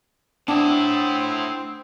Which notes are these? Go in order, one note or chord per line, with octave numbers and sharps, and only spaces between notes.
A2 C4 D4 E4 F#5 G5 D#6